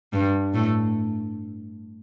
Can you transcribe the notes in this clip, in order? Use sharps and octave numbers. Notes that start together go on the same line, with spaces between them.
G2 G3
A2 A3